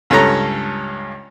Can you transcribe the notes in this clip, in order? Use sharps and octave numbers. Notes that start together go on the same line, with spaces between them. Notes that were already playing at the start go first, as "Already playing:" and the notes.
C#2 G2 C#4 A4 C#5 A#5